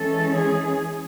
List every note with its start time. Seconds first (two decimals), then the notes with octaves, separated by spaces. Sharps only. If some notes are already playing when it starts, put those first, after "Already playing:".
Already playing: E3 G#3 C#4 A4
0.35 G#4